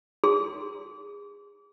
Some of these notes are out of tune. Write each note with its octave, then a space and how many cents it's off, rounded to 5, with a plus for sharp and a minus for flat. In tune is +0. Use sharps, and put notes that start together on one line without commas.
G#4 -25 C6 +0